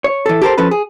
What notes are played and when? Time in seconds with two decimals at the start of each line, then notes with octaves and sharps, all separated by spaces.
0.04 C#5
0.26 E3 A4
0.42 G4 A4 A#4 C5
0.58 F3 C#4 A4 B4
0.71 G#4